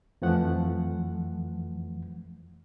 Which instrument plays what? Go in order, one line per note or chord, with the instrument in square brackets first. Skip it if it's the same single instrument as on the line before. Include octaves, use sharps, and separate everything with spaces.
[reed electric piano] F2 E3 F3 A3 F#5